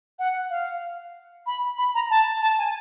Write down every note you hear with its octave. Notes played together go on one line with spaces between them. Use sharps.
F#5
F5
B5
B5
A#5
A5
A5
G#5